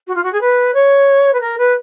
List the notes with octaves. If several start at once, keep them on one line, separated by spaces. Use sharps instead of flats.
F#4
F4
F#4
G#4
B4
C#5
B4
A#4
B4